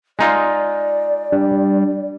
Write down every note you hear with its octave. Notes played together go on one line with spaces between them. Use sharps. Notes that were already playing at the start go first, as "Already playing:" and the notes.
G#3 D#4 F4 D5
G3 D4